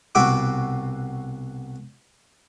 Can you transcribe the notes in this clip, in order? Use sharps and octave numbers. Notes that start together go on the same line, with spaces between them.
C2 B2 F#4 E5 D6